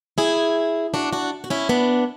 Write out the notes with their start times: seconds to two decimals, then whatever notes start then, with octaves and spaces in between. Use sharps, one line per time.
0.18 E4 G#4
0.94 D4 F#4
1.13 D4 F#4
1.44 F#4
1.50 C#4 E4
1.69 B3 D4